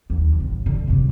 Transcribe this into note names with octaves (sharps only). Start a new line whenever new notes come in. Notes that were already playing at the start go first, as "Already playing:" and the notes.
D#2
A1
A2 D3
F#2 C3